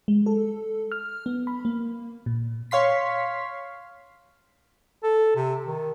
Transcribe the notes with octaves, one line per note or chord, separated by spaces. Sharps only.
G#3
A4
F6
B3
B5
A#3
A#2
C#5 F5 C6 B6
A4
C3
D#3